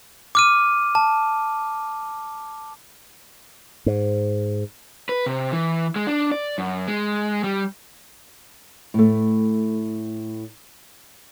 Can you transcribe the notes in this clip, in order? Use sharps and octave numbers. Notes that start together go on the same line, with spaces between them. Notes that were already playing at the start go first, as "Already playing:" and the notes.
D6 F6 D#7
A5
G#2
B4
C3
E3
G#3
D4
D5
F#2
G#3
G3
A2 A3